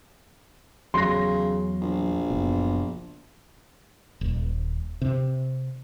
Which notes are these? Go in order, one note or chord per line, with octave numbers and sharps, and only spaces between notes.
E2 C#3 F#3 C6 A#6
A#1
F#1 B2
D#1
C3